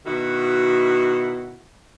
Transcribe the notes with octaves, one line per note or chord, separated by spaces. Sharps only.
B2 D#3 E4 F#4